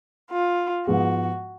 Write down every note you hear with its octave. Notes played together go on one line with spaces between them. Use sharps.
F4
G#2 F3 G#3 B3 F#4